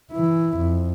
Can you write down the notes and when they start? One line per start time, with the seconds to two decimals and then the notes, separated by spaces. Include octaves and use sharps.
0.12 E3 E4
0.58 F2